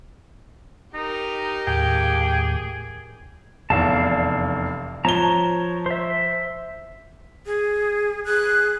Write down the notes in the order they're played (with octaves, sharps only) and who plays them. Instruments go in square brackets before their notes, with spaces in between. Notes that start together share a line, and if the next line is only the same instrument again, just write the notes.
[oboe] D#4 [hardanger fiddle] G4 A#4
[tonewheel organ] D#2 A2 D6 [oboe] G#4 [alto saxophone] G5
[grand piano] F1 E2 [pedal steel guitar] D5 F5 A5
[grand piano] F3 G7 [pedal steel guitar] C#5 A5 A#5
[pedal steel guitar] C5 E5
[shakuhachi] G#4
[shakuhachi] G#4 [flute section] F#6